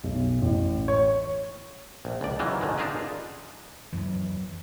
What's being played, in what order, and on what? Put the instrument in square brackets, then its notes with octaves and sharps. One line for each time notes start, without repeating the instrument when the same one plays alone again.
[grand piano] B1
A1
C#5
[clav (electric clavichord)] A#1
C#2 D5
D#3 E3 F#3 A#3
A1 D3 D#3 G#3
D4 D#4 F4 G#4 A#4 B4
[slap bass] F#2 E3